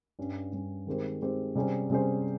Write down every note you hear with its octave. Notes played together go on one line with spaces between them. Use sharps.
G2 G3 C#4
G2 G3 C#4
D#3 G#3 C4 G4 C5
D#3 G#3 C4 G4 C5
C3 G3 C#4 G#4 C5
C3 G3 C#4 G#4 C5